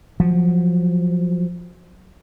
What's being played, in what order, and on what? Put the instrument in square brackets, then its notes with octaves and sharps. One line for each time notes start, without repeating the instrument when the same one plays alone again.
[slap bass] F3 F#3